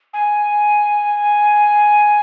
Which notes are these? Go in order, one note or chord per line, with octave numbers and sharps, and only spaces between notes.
G#5